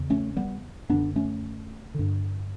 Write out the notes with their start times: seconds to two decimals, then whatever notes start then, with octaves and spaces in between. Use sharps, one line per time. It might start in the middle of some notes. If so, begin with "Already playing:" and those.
Already playing: E2 C#3
0.10 A3 C#4
0.37 G3 B3
0.89 F#2 D3 B3 D4
1.16 A3 C#4
1.94 G2 D3